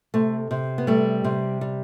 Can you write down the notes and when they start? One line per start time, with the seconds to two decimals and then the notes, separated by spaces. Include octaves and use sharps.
0.14 C3 A3
0.51 C3
0.78 B3
0.87 G3 A3
1.24 C3
1.61 G3